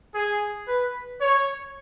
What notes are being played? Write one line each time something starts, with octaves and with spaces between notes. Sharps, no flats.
G#4
B4
C#5